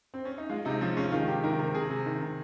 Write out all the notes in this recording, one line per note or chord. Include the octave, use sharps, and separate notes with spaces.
C4
C#4
D#4
G#3 F4
C3 D#4
F3 C#4
G#3 C#4
D#3 F4
C3 G4
D#3 A#4
C3 A#4
C3 G#4
C3
D#3
C3